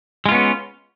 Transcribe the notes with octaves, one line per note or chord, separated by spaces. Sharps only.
G#3 B3 C#4 F4